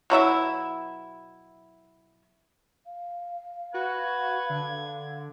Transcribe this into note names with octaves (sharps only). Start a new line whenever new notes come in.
B2 F#3 E4 E5
F5
F#4 B4 G#6
D3